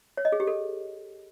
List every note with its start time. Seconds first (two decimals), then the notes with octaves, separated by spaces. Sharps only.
0.17 C#5
0.25 D#5
0.32 G#4
0.40 G4
0.47 A4